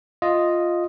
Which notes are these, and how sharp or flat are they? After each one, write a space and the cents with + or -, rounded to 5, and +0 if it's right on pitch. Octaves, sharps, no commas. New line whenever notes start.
F4 +0 D#5 +0